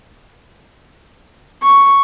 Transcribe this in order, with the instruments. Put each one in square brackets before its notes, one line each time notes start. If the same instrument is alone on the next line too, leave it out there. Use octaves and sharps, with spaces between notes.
[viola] C#6